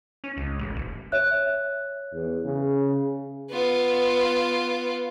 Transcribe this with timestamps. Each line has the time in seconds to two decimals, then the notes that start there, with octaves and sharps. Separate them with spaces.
0.24 C#4
0.37 C#2
0.59 A1
0.75 D#1
1.12 C#5 E5 F#6
2.13 E2
2.45 C#3
3.51 B3 F4